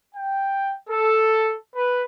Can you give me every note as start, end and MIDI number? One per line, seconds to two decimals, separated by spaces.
0.14 0.72 79
0.88 1.54 69
1.75 2.02 71